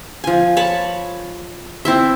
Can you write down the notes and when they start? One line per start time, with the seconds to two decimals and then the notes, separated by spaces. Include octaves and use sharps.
0.24 F3 G#5
0.57 C#5 A5 B5
1.85 C4 E4 E5